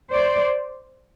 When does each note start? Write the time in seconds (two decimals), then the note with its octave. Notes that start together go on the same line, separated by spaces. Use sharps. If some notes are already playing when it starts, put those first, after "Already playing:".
0.12 C5 D5